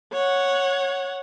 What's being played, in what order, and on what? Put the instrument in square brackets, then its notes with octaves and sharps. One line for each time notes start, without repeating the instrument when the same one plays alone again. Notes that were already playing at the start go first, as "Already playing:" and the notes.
[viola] C#5 F#5